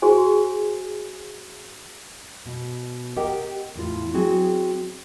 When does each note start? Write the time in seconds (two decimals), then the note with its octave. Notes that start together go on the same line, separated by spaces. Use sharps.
0.02 F#4 G#4 C5 G#5
2.46 B2
3.17 G4 A#4 D#5 F#5 G5
3.75 E2 A2 F4
4.13 F#3 C4 F#4 G#4